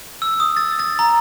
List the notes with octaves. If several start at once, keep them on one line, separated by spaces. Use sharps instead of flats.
E6
D#6
A6
A6
A#5